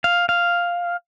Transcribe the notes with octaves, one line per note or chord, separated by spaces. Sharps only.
F5
F5